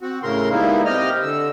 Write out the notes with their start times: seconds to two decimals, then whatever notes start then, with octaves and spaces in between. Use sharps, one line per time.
0.01 C4 F#4
0.23 A2 C#3 A#4 C6
0.51 G3 G#3 A#3 B3 D#4 E4
0.85 C3 G4 D#5 F6
1.23 D3 E6